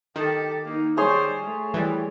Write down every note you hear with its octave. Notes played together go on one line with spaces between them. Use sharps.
D#3 G4 A4
A#3 D#4
G3 G#4 C5 C#5 C6
A3
E3 G3